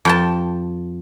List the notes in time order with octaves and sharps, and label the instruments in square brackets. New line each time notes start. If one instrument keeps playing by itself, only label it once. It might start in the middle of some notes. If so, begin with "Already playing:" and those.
[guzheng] F2 G5 A5